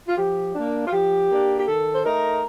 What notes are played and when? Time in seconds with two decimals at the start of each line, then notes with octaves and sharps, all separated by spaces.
0.08 F4
0.18 F3 G4
0.55 A#3 D4
0.87 F4
0.92 F3 G4
1.30 A#3 D4
1.60 G4
1.67 D#3 A4
1.95 C5
2.05 A3 D#4 A#4